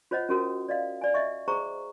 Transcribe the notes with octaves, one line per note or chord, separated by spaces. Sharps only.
F4 C5 C#5 D#5 F#5
C#4 F4 F#4 A4 A#4 D#6
D5 D#5 F5
D5 G#5
D#5 E5 C#6
G#4 C5 A#5 C#6